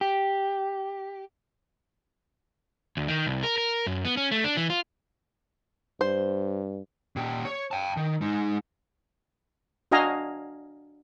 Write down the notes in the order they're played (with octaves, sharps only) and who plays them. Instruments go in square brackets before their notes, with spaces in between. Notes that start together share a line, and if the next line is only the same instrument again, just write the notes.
[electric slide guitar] G4
[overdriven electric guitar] D2
D#3
C2
A#4
A#4
F#2
B3
C#4
A3
D4
E3
F4
[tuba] G2 [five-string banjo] C5
[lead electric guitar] A#2 G4
C#5
G5 A5
D#3
G#3 D#4
[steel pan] D4 F#4 D#5 F5 G#5 A#5